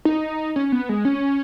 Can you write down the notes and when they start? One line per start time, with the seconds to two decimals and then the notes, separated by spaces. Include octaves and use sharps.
0.05 D#4
0.56 C#4
0.72 B3
0.89 G#3
1.05 C#4